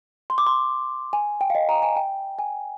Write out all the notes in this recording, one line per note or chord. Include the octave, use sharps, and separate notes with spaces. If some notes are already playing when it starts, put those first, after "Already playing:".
C6
D6
C6
G#5
G5
F5
D#5
A#5
G#5
G5
G#5